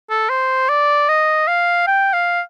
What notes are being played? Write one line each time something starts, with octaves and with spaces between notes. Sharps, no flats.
A4
C5
D5
D#5
F5
G5
F5